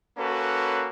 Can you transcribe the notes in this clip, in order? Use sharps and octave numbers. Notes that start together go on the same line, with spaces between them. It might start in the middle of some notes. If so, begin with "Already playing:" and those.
A#3 C#4 F#4 A4 B4